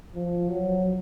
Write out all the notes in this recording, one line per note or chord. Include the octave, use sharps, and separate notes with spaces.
F3
F#3